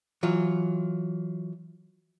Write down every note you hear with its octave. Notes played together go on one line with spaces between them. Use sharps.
E3 F#3 F4